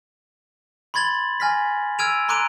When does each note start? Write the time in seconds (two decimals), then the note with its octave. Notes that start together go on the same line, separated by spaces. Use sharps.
0.94 B5 C6 G#6 A6 F#7
1.40 G#5 F6 A#6 B6
1.99 E6 F6 G#6 D7 D#7 F7
2.28 A#5 C6 D6 F#6 D7 D#7